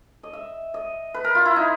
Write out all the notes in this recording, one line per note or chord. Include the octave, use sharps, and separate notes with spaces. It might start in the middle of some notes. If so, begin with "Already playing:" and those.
D#5
E5
D#5
B4
A#4
F4
E4
D#4